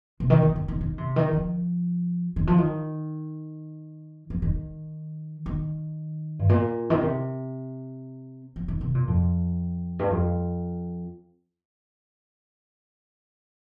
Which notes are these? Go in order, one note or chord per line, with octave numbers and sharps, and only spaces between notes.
C3
D#3
D#3
D#3
D#3
D#3
C3
D#3
F3
D#3
F3
D#3
F3
D#3
D#3
G2
A#2
D#3
C3
F3
D#3
C3
A#2
F2
G2
F2